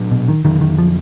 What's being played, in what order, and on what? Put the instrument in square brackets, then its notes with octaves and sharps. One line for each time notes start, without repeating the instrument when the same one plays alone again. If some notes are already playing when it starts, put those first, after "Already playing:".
Already playing: [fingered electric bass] A#2 F#3 D4
[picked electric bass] B2
D#3
[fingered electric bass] F2 D3 F#3 [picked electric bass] D#3
[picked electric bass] D#3
F3